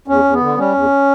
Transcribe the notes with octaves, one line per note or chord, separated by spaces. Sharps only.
E2 C#4
E2
B3
D3
G3 C#4
E2